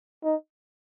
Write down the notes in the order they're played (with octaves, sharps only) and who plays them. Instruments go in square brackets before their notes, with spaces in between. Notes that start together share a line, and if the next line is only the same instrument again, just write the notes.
[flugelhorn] D#4